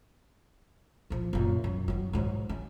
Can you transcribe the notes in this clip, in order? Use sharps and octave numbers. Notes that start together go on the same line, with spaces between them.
A#2 F3
F#2 A#2
F#2
D#3 F#3
G#2 F#3
C#4